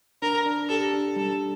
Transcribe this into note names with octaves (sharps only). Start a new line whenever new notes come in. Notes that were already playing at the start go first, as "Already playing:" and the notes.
D4 A#4
D4
G4 A4
D4
G3 A4